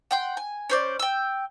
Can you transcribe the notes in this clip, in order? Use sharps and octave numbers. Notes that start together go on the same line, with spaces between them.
F#5 G5 C6
G#5
C#4 C5 D5
G5 E6